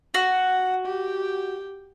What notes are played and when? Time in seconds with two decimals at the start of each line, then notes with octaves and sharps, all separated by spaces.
0.14 F#4 F#5
0.85 G4